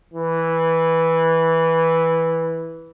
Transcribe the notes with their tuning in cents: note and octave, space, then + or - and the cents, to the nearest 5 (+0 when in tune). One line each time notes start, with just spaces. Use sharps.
E3 -5